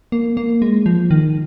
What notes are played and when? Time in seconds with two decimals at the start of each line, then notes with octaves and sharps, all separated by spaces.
0.12 A#3
0.37 A#3
0.62 G#3
0.86 F3
1.11 D#3